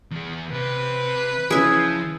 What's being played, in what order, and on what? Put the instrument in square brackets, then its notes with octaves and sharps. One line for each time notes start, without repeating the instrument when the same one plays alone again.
[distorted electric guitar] E2 G#4
[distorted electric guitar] C3 C5 [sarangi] B4
[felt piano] C#3 E3 C#4 [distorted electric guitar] F3 [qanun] G#4 E5